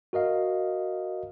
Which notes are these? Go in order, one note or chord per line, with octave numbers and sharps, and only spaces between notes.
F#4 A#4 D#5 F5